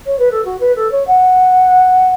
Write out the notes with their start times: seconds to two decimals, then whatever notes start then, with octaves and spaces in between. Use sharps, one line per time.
0.06 C#5
0.18 B4
0.31 A4
0.44 F#4
0.60 B4
0.75 A4
0.91 C#5
1.07 F#5